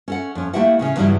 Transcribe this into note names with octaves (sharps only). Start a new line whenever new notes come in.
C#4 A4 F#5
F2 C#4
A3 A#3 E4 G4 E5 F#5
A2 C#3 C#4
E2 G2 C#3 F#3 G3 E4